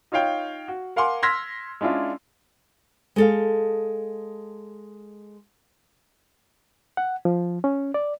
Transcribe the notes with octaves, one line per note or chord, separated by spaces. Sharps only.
D#4 F4 C#5 F5 G5
F#4
A#4 F5 F#5 G#5 C6 D6
C6 E6 F6 G#6 A#6 B6
G#3 C#4 D4 E4 F4
G#3 A4 F5
F#5
F3
C#4
D5